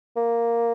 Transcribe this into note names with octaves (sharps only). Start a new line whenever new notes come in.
A#3